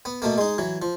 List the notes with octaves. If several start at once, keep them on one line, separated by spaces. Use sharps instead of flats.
B3
B2 A3 A#3
G#3 D#4
E3 F#3
F3